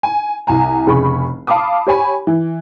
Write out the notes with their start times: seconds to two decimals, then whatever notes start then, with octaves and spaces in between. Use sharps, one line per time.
0.03 G#5
0.47 C2 G#5 A#5
0.87 F1 C#3 G#4 B5 C#6
1.47 F5 A5 B5 D6 D#6
1.87 G4 C#5 G#5 B5
2.27 E3